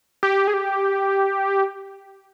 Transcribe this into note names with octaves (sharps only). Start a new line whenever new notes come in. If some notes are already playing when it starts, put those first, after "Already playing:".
G4
G#4
G4